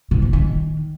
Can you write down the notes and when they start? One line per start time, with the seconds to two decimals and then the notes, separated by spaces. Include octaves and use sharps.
0.11 C3
0.22 A#2
0.33 D#3